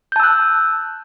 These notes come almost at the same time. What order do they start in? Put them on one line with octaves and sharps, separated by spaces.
G6 A5 E6 F#6